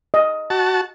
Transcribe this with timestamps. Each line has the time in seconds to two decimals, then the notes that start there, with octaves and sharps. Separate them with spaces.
0.14 D#5
0.50 F#4 A5